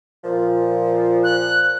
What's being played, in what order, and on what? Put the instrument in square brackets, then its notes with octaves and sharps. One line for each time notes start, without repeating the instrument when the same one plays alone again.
[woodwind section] A#2 F3
[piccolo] F#6